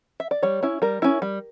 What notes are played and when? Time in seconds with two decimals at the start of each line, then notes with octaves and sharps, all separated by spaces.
0.20 E5
0.31 D5
0.43 G3 C#5
0.63 C#4 E4
0.82 G3 A#4
1.02 C#4 E4
1.22 G3